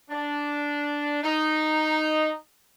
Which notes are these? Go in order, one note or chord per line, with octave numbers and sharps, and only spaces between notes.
D4
D#4